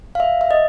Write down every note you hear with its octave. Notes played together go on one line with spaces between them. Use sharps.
F5
E5
E5
D#5